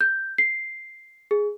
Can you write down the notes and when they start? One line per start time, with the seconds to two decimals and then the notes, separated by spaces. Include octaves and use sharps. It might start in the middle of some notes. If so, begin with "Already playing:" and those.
0.01 G6
0.38 C7
1.31 G#4